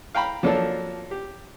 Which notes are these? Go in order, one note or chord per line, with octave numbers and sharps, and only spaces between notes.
F5 G5 A#5 B5
F3 F#3 A#3 C#4 D4 A4
G4